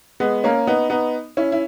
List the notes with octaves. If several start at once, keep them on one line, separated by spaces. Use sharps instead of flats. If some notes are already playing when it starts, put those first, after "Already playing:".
G#3 B3
A#3 C#4
B3 D#4
B3 D#4
C#4 E4
E4